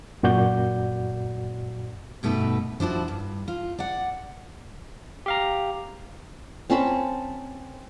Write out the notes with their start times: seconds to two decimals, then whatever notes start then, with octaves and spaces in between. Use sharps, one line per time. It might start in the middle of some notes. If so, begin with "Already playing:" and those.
0.23 F#2 A#2 F#4 D5 G6
2.23 G2 B2 A3 D#4 B4
2.80 F3 D4 E4 F#4
3.08 G2
3.48 F4
3.79 D5 F#5
5.26 G4 F5 A#5
6.70 C4 C#4 A5 B5